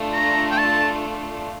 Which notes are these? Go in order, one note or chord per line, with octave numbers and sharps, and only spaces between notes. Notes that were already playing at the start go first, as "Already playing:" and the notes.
Already playing: A3 D4 F4
A#5
G5
A5